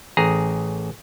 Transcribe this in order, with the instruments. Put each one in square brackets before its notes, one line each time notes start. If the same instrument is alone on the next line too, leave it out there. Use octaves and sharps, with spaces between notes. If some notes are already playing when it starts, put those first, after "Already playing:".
[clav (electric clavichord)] A1 G#4 A#5